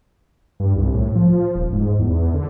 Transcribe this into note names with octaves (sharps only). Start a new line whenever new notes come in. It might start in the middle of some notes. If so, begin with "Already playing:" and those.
G2
C2
A2
F3
D#1
G#2
E2
D3